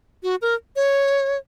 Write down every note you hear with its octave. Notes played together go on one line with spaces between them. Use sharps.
F#4
A#4
C#5